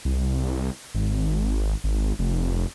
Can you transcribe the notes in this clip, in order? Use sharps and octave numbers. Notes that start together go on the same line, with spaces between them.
C2
G#1
G#1
F1